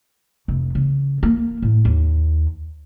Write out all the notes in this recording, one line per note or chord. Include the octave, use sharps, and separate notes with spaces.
F1
C#3
A#3
A2
D#2